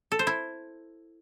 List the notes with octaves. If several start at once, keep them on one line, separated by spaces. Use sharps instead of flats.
A4
C5
E4